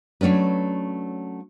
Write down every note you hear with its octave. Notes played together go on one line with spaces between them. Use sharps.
F#3 A3 C#4 D4 B4